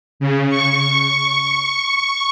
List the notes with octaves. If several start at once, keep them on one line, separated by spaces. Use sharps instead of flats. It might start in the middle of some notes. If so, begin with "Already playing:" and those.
C#3
C#6